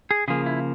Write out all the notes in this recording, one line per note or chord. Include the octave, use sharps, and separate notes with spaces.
G#4
C#3 F3 A#3 G#4
E4